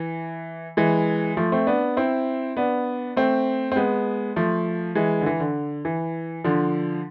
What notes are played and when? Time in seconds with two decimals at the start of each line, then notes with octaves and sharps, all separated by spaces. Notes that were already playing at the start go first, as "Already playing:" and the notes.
Already playing: E3
0.77 E3 G#3
1.37 F3 A3
1.52 A3 C4
1.67 B3 D4
1.97 C4 E4
2.57 B3 D4
3.16 A3 C4
3.72 C4
3.76 G#3 B3
4.36 F3 A3
4.95 E3 G#3
5.21 D3
5.26 E3
5.40 D3
5.85 E3
6.44 D3 F3